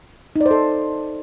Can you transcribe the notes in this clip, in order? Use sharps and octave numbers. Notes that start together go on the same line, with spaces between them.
D#4
D5
C5
A4